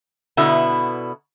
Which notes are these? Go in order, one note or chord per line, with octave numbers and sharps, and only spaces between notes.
B2 D3 B3 E4